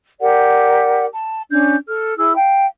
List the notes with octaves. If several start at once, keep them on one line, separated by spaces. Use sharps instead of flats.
G4 A#4 D5 F#5
A5
C#4 D4 G6
A4 F6
E4 G#4 E6
F5 G5